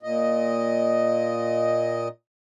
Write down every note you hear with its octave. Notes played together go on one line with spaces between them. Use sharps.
A#2 D#5